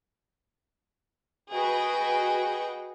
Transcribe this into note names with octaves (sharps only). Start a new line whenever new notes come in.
F#4 G#4 B4 D#5 G5